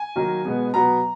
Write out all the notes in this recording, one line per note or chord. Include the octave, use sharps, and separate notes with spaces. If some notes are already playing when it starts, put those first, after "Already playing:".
Already playing: G#5
D#3 F#3 A#3
B2 G#3 B3
B2 F#3 B3 A#5